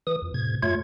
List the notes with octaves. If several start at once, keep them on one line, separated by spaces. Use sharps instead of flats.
E3 D#6
F2
A2 C3 G#6
F#2 A3 F4 C#5 G#6